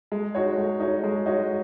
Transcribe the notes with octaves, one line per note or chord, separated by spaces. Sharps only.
G#3
D#4 F#4 C#5
G#3
D#4 F#4 C#5
G#3
D#4 F#4 C#5